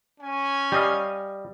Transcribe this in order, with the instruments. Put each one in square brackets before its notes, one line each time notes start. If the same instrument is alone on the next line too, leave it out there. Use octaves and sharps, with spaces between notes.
[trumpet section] C#4 G#5
[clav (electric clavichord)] G3 D#5 F5